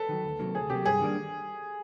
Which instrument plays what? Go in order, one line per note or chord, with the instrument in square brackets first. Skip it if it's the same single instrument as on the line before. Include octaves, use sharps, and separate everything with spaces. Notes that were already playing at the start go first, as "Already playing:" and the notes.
Already playing: [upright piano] A4 B4
[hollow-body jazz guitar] D#3 F#3
D2
C3 D#3 F#3 A#3
[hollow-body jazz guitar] D2 [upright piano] G#4
[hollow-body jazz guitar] C3 D#3 F#3 A#3 [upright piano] G4
[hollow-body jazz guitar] G2 [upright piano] G#4
[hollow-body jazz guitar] D#3 G3 A#3 D4